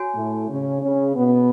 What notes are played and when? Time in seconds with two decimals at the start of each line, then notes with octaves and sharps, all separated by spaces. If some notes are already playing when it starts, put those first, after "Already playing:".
Already playing: F#4 C#5 G#5
0.15 A2 A3
0.48 C#3 C#4
0.82 C#3 C#4
1.16 B2 B3